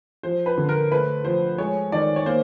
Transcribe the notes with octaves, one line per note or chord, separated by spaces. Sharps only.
F3 C5
B4
D3
A#4
A3 B4
F3 C5
G#3 C#5
D#3 D5
C#5
A#3 C5